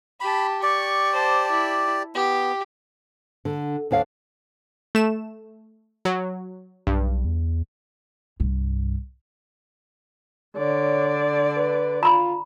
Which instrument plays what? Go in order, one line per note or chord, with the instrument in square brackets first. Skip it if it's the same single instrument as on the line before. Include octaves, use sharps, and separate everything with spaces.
[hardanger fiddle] G4 A5 [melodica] B5
[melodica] G4 D5 [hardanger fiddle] C#6
[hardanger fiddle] C5 A5
E4
[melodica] B3 [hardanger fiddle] G4
[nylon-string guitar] D3
D2 D4 C#5 F5
[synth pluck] A3 E7
F#3
[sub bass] B1 [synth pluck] G2
[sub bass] E2
[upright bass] C2 G2
[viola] D3 D5 [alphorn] C#5
[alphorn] B4
[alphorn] F4 [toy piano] A#5 B5